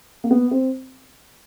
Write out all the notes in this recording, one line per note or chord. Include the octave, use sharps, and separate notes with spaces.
A#3
B3
C4